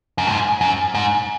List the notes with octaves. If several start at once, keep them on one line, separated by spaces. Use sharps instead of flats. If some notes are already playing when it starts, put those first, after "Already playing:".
F#2
G#2
F#2
G#2